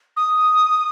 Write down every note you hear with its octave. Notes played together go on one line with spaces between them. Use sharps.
D#6